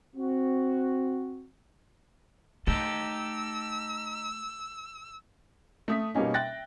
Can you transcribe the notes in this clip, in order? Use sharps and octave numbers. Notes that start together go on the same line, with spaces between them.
C4 F#4
A3 D#4 G4 A4 E6
A3 D#6 B6
B2 G3 A#3 C#4 D#4
E5 G5 F#6 A6 A#6